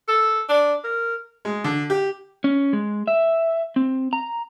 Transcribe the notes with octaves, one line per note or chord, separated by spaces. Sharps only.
A4
D4
A#4
G#3
D3
G4
C#4
G#3
E5
C4
A#5